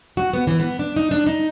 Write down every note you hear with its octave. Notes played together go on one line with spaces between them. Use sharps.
F#4
B3
E3
B3
D4
D#4
D4
D#4